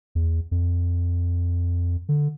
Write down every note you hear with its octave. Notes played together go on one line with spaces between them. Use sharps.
E2
F2
D3